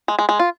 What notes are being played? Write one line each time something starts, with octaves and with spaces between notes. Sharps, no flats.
G#3
G#3
G#3
F4